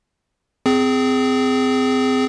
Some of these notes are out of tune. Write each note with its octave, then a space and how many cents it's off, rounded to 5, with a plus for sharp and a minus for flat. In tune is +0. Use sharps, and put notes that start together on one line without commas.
C4 -25 G#4 +0